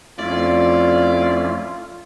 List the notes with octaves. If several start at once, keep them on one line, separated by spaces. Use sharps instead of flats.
F2 A3 C#4 E4 F4 D5